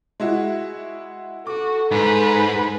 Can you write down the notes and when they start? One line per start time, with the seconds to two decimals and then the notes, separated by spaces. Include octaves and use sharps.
0.20 G#3 E4 F#4
1.47 F#4 A4 D6
1.91 G#2 B4